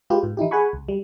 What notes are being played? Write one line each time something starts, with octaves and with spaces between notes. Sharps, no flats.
G#3 F4 G4 B4
G#2
E3 D#4 E4 G4
G#4 F#5 G#5 B5 C#6
C#2
G3